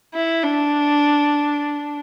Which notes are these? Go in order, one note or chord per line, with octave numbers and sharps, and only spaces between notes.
E4
D4